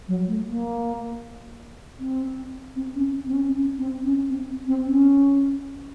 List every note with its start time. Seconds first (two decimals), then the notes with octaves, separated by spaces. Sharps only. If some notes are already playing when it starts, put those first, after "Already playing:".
0.08 F#3
0.28 A3
0.47 A#3
1.99 C4
2.76 C4
2.96 C#4
3.27 C4
3.33 C#4
3.53 C#4
3.78 C4
4.04 C#4
4.30 C4
4.68 C4
4.87 C#4